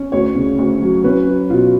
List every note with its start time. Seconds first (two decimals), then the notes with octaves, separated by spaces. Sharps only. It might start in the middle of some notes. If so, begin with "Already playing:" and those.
Already playing: C#4
0.12 D2 C#5
0.35 C#3
0.59 D2
0.82 F#3
1.04 C#4 B4
1.27 F#3
1.50 B2 F4